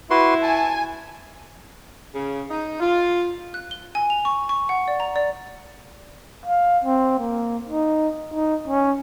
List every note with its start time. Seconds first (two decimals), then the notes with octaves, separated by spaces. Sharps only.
0.11 E4 F#4 B4 C6
0.43 G#5 A5
2.15 C#3
2.50 D#4
2.80 F4
3.54 F#6
3.71 G7
3.95 G#5
4.10 F7
4.25 C#6
4.49 C#6
4.69 F#5
4.88 D5
5.00 A#5
5.16 D5
6.46 F5
6.84 C4
7.19 A#3
7.69 D#4
8.34 D#4
8.68 C#4